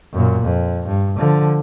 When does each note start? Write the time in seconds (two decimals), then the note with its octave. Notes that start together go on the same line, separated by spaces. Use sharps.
0.13 F#2 A#2
0.43 F2
0.86 G2
1.18 D3 F3